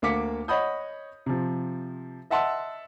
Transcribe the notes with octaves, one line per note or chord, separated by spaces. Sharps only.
D2 A#3 F5 D6 B6 C#7
C#5 D#5 F#5 B5 D#6 G6
C3 F3
D#5 E5 F#5 A5 C6 E6